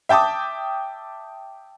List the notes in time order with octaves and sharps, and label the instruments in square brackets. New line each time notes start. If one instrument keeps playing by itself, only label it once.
[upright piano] E5 G5 A5 D6 D#6